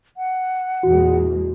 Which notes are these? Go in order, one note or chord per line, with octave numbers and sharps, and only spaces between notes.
F#5
E2 A#2 G#3 F#4